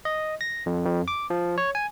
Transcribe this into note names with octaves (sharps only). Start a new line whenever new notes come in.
D#5
A#6
F2
F2
D6
F3
C#5
G#5